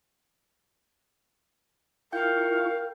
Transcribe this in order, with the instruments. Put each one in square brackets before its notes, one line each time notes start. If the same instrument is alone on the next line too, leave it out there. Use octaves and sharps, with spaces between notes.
[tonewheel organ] E4 F4 C#6 [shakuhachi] A#4 [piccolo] F5 [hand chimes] G5 G6